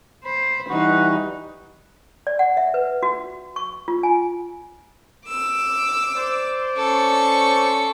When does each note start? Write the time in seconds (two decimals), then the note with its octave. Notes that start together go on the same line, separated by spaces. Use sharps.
0.25 C5 B5
0.69 E3 G3 D#4 F#4 B4
2.27 D5
2.39 F#5
2.57 E5
2.74 B4
3.03 F#4
3.56 C#6
3.88 F4
4.03 G#5
5.28 D6 E6
6.16 C5 D5
6.77 C#4 A4 C#6